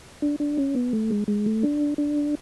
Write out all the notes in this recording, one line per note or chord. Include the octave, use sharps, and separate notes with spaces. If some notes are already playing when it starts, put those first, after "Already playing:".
D4
D4
C#4
B3
A3
G#3
G#3
A3
D4
D4